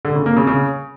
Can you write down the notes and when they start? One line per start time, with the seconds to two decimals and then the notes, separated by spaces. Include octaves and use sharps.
0.05 D3
0.15 C#3
0.26 A#3
0.37 C#3
0.47 C#3